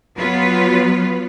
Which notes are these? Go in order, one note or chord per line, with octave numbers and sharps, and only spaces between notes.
F#3 B3 F4 B4